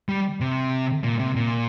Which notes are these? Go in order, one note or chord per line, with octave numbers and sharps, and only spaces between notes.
G3
C3
A#2
C3
A#2